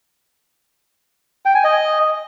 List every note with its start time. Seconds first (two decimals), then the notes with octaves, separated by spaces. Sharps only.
1.45 G5
1.55 G#5
1.64 D#5